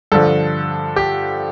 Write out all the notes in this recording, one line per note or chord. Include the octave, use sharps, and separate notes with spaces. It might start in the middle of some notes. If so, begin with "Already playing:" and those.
G2 D3 F3 A4
G4